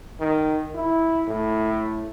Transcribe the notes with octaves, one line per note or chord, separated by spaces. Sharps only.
D#3
E4
A2